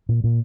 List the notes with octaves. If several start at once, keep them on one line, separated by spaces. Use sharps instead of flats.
A#2
A#2